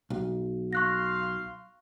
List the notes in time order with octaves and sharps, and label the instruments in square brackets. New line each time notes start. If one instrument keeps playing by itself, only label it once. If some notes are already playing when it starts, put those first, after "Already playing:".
[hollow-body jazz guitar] B1
[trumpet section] F5 C6 [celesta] C#6 F#6 A#6